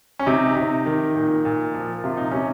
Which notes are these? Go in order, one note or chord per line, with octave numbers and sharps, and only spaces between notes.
C#4
C3 D#4
C3
D#3
A#2
A#2
F3
C3 F4
D#4
C3 C#4